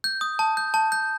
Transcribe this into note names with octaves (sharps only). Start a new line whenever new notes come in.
G6
D#6
A5
G6
A5
G6